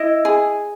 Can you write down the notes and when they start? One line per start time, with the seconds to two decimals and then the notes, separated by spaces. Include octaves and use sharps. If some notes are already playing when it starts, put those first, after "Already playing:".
Already playing: E4 D#5
0.25 G#4